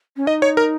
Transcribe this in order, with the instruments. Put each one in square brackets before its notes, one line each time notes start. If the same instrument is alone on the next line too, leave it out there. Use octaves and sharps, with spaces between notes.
[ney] C#4
[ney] D#4 [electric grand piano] D#5
[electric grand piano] C#5
A#4